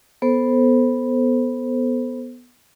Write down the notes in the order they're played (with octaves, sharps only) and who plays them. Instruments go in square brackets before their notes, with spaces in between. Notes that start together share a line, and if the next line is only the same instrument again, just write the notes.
[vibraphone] B3 A4 C5